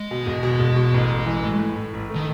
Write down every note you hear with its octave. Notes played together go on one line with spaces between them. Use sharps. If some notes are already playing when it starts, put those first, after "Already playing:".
Already playing: G#3
B2
E1
B2
E1
B2
A1
A1
E3
A2
A2
A2
A1
A3
D#3